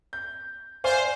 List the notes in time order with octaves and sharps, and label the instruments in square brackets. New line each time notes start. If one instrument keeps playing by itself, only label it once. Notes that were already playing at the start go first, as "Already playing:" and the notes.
[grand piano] G6
[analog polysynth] C5 [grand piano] D5 F5 G#5